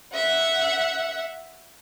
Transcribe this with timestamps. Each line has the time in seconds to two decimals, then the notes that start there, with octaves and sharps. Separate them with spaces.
0.14 E5 F#5